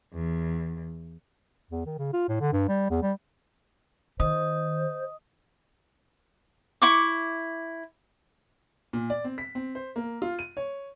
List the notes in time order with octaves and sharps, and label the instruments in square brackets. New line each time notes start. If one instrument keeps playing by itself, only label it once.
[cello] E2
[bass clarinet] E2
D#3
C#3
F4
A2
D3
G2
G3
E2
G3
[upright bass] D#3 [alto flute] C5 [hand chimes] D#5 D#6
[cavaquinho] E4 C#6 D6
[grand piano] A#2
D5
C4
B6
C4
C5
A#3
F4
D#7
C#5